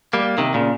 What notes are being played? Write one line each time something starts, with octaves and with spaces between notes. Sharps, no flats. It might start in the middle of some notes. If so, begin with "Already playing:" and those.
G3 A#3
C3 D#3
A#2 C#3